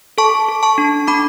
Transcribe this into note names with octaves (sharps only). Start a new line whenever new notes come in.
A4 A5 C#6
A4
A5 C#6
D4
D4 B5 D6